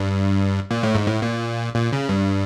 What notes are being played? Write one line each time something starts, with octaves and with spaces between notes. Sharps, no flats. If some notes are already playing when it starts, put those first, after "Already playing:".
Already playing: G2
A#2
A2
G#2
A2
A#2
A#2
C#3
G2